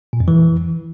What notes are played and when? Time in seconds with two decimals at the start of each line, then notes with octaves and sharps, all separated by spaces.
0.13 A#2
0.20 F2
0.28 E3